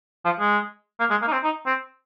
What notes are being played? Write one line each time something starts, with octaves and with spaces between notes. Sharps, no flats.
F3
G#3
A#3
G#3
A#3
D#4
C4
D#4
C4